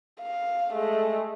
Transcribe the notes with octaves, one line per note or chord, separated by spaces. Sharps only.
F5
G#3 A3